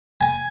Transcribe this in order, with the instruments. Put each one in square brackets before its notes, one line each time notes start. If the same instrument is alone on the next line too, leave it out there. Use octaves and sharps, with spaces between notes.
[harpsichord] G#5